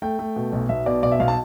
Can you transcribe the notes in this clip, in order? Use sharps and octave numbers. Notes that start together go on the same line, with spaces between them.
A3 G5
A3
B2
B1
B1 E5
B2 D5
B1 D5
E5
B1 F5
A5